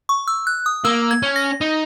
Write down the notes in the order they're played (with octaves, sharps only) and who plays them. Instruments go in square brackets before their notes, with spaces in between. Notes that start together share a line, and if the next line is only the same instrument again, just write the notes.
[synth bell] C#6
E6
F#6
D#6
[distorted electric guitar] A#3 [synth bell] E6
[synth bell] G#6
[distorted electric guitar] C#4
[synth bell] A#6
[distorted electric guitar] D#4